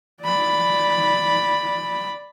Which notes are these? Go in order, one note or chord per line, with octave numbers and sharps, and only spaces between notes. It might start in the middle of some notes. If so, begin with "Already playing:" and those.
D5 B5